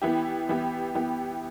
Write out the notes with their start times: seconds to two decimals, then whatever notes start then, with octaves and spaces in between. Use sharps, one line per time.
0.02 E3 B3 E4 G4
0.49 E3 B3 E4 G4
0.95 E3 B3 E4 G4